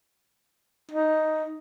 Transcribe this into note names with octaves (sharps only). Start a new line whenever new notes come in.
D#4